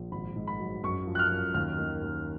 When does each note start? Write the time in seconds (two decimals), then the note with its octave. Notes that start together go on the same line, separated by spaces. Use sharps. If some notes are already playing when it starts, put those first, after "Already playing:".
Already playing: A#1
0.11 G#1 B5
0.35 G#2
0.47 B5
0.60 F#3
0.83 F#2 C#6
1.07 F3
1.15 F#6
1.19 F6
1.31 F#2
1.54 D#2 F6
1.78 D#3
2.02 D#2